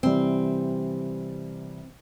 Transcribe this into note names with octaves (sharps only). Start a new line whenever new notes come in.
C3 E3 G3 C4